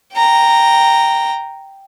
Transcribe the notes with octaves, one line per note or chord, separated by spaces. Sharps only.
G5 A#5